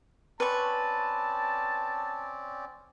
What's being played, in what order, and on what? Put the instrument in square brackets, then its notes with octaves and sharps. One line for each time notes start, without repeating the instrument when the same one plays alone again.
[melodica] C4 C#4 D5 [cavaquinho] B4 C#6 [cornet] A5